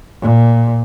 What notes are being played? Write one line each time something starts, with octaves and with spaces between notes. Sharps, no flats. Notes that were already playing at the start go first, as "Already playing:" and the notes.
A#2